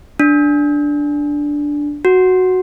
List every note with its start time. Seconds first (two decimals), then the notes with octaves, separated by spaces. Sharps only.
0.20 D4
2.05 F#4